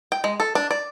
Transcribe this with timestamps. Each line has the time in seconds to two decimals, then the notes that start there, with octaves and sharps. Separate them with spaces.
0.12 G5
0.24 G#3
0.40 A4
0.55 D4
0.71 D5